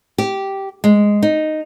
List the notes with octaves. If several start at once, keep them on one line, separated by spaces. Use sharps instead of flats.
G4
G#3
D#4